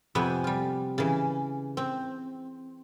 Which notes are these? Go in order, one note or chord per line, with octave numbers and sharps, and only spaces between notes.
F2 C3 B3 B4 G5 G#5
G3 F4
C#3 E3
C4